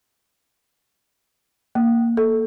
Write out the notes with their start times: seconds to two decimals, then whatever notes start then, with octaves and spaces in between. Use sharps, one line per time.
1.75 A#3
2.17 A4